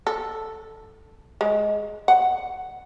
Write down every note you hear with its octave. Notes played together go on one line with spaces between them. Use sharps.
A4
G#3
F#5